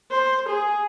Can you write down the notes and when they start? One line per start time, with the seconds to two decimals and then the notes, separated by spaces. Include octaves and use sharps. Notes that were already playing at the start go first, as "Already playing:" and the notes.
0.11 C5
0.49 G#4